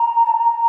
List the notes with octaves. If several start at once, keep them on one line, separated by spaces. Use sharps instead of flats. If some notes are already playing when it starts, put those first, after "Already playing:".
Already playing: A#5
A5
A#5